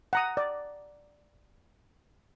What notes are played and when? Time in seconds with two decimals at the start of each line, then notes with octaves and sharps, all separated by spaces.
0.13 F#5 A#5 D#6
0.37 D5